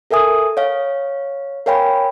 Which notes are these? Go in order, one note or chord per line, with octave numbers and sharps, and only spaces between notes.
A4 A#4 E5 G#5 D#6
C#5 F5
A#4 C#5 F5 G5 G#5 B5